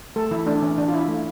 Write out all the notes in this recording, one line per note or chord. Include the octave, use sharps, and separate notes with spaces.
A3 A4
E3 E4
A3 D4
E3 C#4
E3 D4
F4
C#4 E4
A3